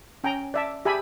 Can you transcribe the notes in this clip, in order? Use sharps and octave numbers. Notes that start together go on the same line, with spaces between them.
C#4 G5 G#5 A#5
D5 E5 A5
G4 G#4 E5 G#5 A5 B5